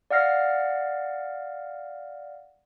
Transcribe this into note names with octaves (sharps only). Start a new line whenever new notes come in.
D5 F5 F#5 F6 A#6 C7